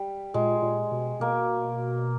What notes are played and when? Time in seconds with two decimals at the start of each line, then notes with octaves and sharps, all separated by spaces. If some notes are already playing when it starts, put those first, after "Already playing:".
Already playing: G3
0.34 A#2 G#3
0.62 A#2
0.92 B2
1.20 B2 A#3